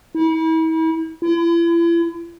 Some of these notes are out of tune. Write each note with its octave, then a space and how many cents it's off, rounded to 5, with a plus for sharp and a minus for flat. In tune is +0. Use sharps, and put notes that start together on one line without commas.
E4 -40
E4 +40